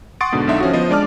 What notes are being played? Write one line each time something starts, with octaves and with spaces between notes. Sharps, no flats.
F#5 C6 C#6 D#6 A6 D7
G#2 B2 D3
B1 D3 D#4 E5 C6
F3 C#4 F#4
F3 B3 C5 D#5
G#3 D4 D5 A5 D6 F6